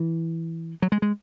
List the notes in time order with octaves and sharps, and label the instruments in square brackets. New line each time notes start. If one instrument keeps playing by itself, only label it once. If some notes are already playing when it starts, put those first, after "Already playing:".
Already playing: [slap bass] E3
F#3
G#3
G#3